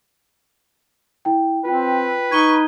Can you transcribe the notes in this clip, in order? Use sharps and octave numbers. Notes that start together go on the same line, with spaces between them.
E4 G5
C4 F4 B4 G5
D#4 C#6 G#6 D#7 G7